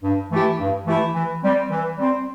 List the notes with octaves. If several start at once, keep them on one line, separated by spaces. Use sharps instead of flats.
G2
E3 A3 E4 G4
G2
E3 A3 E4 G4
E3
G3 C4
E3
G3 C4